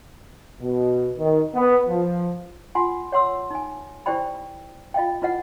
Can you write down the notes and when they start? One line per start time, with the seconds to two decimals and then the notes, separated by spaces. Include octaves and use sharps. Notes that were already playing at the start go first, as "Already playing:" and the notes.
0.61 B2
1.18 D#3
1.55 B3
1.89 F3
2.75 F4 F#5 G#5 C6
3.12 C#5 F#5 C6 E6
3.50 D#4 G#5
4.06 E4 G4 C5 D5 G5 B5
4.94 F4 D#5 F5 G5
5.22 E4 F4 B4 D#5 F#5